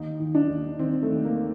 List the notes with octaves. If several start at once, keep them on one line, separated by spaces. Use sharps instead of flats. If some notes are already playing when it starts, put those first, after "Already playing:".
Already playing: D#2 D#4
D#3
D4
D#2
D#3 C4
A3
D#2
A#3